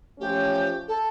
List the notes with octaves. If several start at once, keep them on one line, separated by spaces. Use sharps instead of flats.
F3 A3 C#4 G4
A4